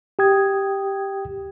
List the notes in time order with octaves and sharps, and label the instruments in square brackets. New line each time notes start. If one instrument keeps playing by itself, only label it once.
[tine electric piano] G4 G5 D#6 G#6